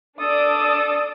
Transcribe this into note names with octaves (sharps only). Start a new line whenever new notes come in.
D4 A4 D6 D#6